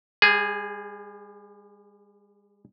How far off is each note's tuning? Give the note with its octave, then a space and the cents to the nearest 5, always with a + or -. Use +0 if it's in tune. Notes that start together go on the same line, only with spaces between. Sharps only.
G3 +40 G#4 +0